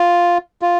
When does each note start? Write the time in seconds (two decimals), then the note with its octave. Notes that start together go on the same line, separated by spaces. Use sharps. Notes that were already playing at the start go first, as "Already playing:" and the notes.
Already playing: F4
0.62 F4